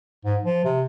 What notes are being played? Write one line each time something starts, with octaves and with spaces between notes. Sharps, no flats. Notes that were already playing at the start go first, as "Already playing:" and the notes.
G#2
F3
C3